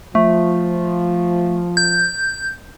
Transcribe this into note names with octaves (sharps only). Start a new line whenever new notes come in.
F3 A3
G6